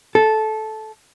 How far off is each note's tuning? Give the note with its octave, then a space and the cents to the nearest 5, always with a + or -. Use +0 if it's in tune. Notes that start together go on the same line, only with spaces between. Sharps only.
A4 -15